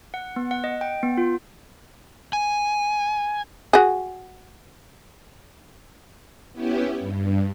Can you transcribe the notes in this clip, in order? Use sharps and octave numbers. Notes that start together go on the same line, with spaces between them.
F#5
B3
F#5
D#5
G5
B3
F4
G#5
F#4 G#4
B3 C#4 E4 G4
G2